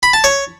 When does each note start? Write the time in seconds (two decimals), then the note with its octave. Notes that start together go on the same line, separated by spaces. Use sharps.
0.03 B5
0.13 A5
0.24 C#5